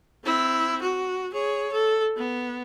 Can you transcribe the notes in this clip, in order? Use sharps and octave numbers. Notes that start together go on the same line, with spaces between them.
C4 E4
F#4
G#4 C#5
A4
B3